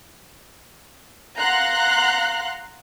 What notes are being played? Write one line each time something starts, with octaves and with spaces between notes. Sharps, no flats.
F5 F#5 A#5 C6 F#6